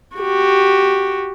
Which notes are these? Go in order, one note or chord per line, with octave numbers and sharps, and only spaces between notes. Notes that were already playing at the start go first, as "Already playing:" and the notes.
F#4 G4